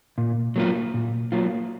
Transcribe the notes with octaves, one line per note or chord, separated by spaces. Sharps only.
A#2
F#3 A#3 F4
A#2
F#3 A#3 F4